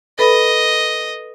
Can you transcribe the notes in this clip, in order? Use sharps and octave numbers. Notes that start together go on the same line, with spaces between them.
A4 B4 D#5 B5